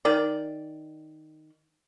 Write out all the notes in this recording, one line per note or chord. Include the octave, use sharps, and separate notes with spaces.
D#3 D5